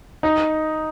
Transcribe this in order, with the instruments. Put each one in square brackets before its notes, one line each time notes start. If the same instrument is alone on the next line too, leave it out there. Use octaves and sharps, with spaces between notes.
[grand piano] D#4